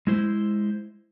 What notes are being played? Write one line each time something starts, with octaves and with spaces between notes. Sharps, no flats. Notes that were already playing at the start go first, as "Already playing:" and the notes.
G#3 E4 C5